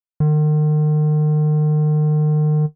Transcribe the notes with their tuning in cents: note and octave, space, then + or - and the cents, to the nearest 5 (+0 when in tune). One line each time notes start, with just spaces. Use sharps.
D#3 -40